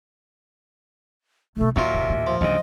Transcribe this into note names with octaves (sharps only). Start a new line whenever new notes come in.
B1 B2 A3
D#2 A#2 F#3 A#3 D4 F4 E5
F1 A#3
A2
F3
D2 G#2 C#3 G3 D#5